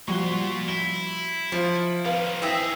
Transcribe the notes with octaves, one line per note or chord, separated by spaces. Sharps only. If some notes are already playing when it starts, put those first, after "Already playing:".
A#2 F3 G3 F#4 C6 C#6
E4 G7
F3 F4 C#7 D7
D#3 G3 B4 F5
G2 E3 C4 G#4 D#5 E5 E6